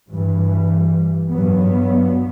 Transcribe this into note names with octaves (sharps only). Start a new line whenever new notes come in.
G2 E3 G3
G2 F#3 B3